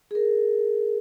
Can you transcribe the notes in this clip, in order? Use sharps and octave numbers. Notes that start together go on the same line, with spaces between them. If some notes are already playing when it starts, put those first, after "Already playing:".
G#4 A#4